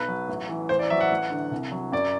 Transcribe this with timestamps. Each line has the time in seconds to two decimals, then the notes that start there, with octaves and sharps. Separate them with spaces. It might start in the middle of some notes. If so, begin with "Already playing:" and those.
Already playing: B1 B4
0.08 F#3
0.29 A1
0.49 E3
0.69 A1 C5
0.79 D5
0.90 F#3 E5
1.01 F#5
1.11 A1
1.31 D3
1.51 C2
1.72 F#3
1.92 F#2 D5